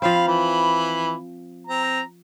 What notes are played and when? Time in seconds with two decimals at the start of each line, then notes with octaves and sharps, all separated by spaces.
0.02 F3 C4 F5 B5
0.27 E3 B5
1.67 C4 A#5